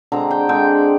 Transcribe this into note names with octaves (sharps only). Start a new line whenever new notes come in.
D3 G#3 C4 A#5
G5
D3 G#3 C4 G5